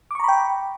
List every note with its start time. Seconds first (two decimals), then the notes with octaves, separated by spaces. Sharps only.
0.11 D6
0.15 C#6
0.20 A#5
0.24 B5
0.28 G5